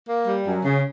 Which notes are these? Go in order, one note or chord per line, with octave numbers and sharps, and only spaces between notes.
A#3
G3
F#2
C#3